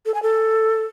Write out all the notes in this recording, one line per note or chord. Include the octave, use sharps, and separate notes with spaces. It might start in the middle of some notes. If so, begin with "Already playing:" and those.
A4
G#5
A4